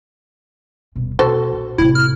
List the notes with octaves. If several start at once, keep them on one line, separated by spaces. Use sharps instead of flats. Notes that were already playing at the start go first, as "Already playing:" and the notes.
D#1 B2
B2 F#4 A4 C5
A#1
A2 C3 E4
F6